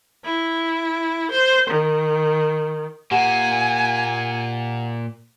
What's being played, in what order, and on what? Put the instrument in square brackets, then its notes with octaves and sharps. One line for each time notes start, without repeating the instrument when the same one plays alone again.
[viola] E4
C5
D#3
[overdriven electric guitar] A#2 A#3 [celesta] G4 F#5 E7 [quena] G#5